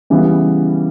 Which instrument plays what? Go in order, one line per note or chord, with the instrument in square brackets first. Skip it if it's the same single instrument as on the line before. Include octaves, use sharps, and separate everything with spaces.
[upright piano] C#3 E3 G3 B3